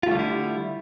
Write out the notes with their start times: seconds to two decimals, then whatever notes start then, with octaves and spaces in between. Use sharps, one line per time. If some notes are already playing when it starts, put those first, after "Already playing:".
0.03 F4
0.07 A3
0.11 G3
0.15 D3
0.19 E4